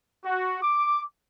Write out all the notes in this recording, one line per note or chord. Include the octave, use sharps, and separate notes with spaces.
F#4
D6